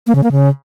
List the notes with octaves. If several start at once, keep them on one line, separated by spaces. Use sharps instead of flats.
A#3
C#3
A#3
C#3